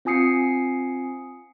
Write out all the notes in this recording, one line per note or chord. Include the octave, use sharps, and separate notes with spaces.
C4 F4 G#5 D#6 C7 C#7